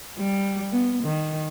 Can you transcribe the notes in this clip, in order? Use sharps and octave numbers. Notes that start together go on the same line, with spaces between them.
G3
B3
D#3